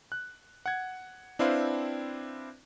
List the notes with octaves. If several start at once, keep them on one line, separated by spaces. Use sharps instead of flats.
F#6
F#5 G#6
C4 D4 E4 B4 C5 F5